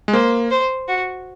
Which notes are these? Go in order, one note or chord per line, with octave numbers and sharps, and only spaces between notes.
G#3
A#3 C5
C5
F#4